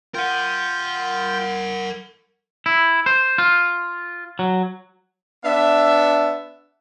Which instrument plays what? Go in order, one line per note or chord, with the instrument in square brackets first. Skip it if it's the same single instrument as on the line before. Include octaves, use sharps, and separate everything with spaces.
[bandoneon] F4 G5 G6 [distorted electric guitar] A#4 F#5
[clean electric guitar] E4
C5
F4
F#3
[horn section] B3 D4 E5